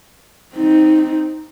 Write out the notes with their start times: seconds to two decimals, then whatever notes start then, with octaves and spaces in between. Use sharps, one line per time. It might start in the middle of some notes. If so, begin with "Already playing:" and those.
0.55 C4 D#4